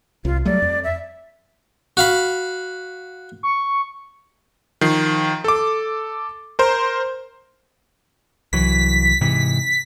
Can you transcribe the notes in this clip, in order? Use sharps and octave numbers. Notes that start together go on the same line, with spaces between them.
C2 F4
F#3 G3 A3 D5
F2
E5
F#4 F5 B5
C#6
D#3 F3 C7
A4 D6
A#4 C5
C2 E3 F#3 B6
G#2 C3 E3